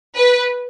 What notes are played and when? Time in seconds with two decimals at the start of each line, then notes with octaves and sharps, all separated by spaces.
0.15 B4